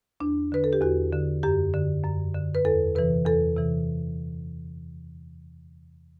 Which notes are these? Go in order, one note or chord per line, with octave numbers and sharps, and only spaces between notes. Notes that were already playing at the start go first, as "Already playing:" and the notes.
E2 D4
D3 B4
A4
G4
E2 F#4
D3
F#2 G4
D3
F#2
D3
B4
E2 A4
C3 E3 B4
E2 A4
C3 E3